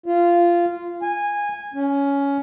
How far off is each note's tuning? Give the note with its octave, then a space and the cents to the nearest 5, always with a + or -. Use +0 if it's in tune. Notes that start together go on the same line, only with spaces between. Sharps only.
F4 -15
G#5 -15
C#4 +15